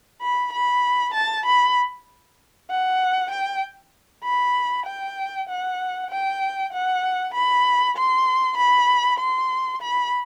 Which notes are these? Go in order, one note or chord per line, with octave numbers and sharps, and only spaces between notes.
B5
B5
A5
B5
F#5
G5
B5
G5
F#5
G5
F#5
B5
C6
B5
C6
B5